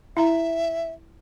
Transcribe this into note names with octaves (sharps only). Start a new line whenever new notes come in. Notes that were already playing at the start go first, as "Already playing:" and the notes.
E4 E5 A#5